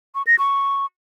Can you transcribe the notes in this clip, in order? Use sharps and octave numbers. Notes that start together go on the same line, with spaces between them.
C#6
A#6
C#6